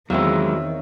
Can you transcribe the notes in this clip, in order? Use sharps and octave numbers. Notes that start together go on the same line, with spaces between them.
E2 D#3 F#3 G#3 C4 C#5 E5 F5